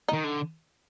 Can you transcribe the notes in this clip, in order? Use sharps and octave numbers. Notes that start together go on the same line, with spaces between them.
D#3 D#4
D3